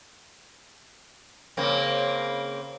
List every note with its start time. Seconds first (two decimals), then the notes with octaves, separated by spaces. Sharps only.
1.57 C#3 A#3 C4